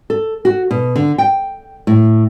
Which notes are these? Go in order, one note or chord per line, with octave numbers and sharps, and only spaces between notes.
A4
F#4
B2
D3
G5
A2